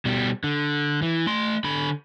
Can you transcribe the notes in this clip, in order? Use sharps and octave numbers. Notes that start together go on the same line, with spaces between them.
B2 G3
D3
E3
A3 C6
D3 B5